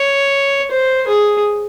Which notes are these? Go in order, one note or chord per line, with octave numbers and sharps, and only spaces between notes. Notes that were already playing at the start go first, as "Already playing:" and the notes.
Already playing: C#5
C5
G#4